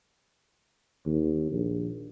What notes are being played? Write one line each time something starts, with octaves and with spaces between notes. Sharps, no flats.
D#2
A#1